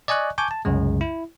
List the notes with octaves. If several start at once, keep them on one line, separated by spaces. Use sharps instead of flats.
D5 D#5 G#5 C#6 F#6
G#5 A5 C#6 D6 G6
A5
C2 F#2 C#3 G#3
E4